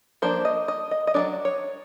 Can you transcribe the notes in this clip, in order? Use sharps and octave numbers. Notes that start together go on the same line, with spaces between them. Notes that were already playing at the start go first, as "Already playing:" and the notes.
F3 A#3 D4 C5
D#5
D#5
D#5
D#5
F#3 A3 D4 D5
C#5